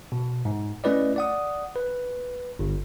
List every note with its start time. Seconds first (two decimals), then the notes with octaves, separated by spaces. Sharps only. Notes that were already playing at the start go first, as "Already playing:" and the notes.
0.12 B2
0.45 G#2
0.84 A3 C#4 E4 B4 D5 D#5
1.16 D5 F#5 D#6
1.76 B4
2.59 G1